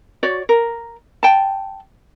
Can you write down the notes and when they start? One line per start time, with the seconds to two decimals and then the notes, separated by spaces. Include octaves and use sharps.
0.23 F#4 C#5 D5
0.49 A#4
1.23 G5 A5